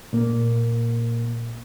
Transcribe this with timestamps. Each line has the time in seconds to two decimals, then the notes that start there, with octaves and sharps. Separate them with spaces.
0.13 A#2 A#3